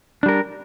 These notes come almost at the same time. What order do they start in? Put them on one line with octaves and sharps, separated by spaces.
D4 G3 A#4